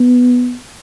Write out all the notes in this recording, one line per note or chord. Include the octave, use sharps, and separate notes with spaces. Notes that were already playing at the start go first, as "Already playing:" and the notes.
Already playing: B3